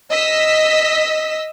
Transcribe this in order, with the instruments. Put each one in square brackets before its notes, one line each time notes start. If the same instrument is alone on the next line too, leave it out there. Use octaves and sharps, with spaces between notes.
[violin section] D#5 E6 B6